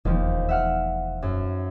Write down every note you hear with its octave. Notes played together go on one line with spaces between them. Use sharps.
E1 D#2 F3
E5 F#5 F6
F#2